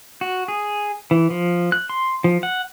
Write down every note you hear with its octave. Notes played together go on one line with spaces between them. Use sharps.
F#4
G#4
E3
F3
F#6
C6
F3
F#5